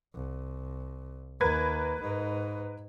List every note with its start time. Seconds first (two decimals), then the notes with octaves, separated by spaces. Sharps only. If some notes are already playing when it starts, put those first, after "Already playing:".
0.14 C2
1.41 D#2 A#4 B4 G#6
2.02 G#2 D#4